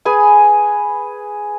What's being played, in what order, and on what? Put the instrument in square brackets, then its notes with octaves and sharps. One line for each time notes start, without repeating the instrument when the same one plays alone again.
[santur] G#4 B4 G#5